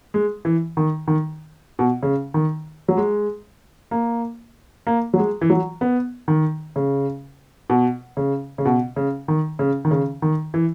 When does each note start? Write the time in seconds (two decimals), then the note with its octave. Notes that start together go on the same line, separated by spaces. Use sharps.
0.14 G#3
0.45 E3
0.77 D#3
1.08 D#3
1.79 B2
2.03 C#3
2.34 D#3
2.88 F#3
2.97 G#3
3.91 A#3
4.87 A#3
5.14 F#3
5.18 G#3
5.41 E3
5.50 F#3
5.81 B3
6.28 D#3
6.76 C#3
7.70 B2
8.17 C#3
8.58 C#3
8.65 B2
8.96 C#3
9.28 D#3
9.59 C#3
9.85 D#3
9.91 C#3
10.22 D#3
10.54 E3